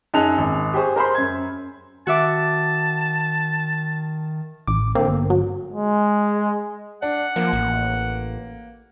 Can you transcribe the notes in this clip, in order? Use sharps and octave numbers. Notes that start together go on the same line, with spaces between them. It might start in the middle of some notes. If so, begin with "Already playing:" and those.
F#2 D#4 G#4 A5 F#6 F7
G#1
G4 G#4 C5 C#6
A#4 C5 B5 C6
F#2 G#6
D#3 F#4 E5 A5 D6
A1 D6
D3 A#3 C4
G1
F#3
G#3
D4 F#5
F3 A#3
A1